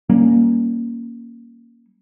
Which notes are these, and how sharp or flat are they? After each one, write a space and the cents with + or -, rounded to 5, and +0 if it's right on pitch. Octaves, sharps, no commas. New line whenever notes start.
G3 +0 A#3 +5 C#4 +0